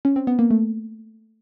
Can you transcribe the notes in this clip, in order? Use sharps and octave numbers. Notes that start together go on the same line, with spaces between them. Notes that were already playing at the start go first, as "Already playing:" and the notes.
C#4
C4
B3
A#3
A3